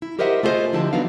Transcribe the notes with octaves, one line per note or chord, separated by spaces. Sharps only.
E4
G4 A#4 C5 D#5 E5 F#5
A3 F4 G#4 A4 C5 D#5
D3 F3 F#3 E4 G4 A5
E3 F#3 B3 D4 D#4 F5